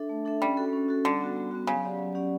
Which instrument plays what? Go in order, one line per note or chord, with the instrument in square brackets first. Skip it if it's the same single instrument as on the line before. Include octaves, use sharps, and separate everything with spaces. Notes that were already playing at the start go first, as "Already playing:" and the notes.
Already playing: [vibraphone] D4 A4 E5
A3
D4 A4 E5
[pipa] G3 [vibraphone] C#4
[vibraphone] F#4 A4
C#4
F#4 A4
[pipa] D3 [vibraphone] G3
[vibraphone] B3 F#4
G3
B3 F#4
[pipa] C#3 [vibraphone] F#3
[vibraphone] C#4 G4 D5 F#5
F#3
C#4 G4 D5 F#5